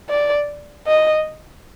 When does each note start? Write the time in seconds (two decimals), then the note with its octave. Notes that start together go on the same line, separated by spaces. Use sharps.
0.09 D5
0.88 D#5